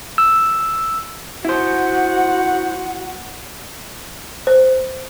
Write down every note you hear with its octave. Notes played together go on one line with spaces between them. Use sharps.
E6
E4 F#4 C5 F#5
C5